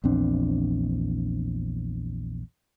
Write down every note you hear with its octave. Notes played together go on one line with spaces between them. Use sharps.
A#1 E2 C4 D4